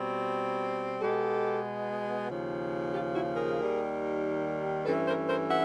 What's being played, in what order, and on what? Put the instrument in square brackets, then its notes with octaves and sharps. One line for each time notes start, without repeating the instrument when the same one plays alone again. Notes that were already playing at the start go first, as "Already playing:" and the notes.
Already playing: [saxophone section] B2 G3 C4
B2 G#3 B3 G4 A4
D#2 C#3 F3
F4 G4
E4 F#4
G#4 A#4
D#2 D#3 G3
G2 E3 A3 C#4 A4 B4
A#4 C5
A#4 C5
E5 F#5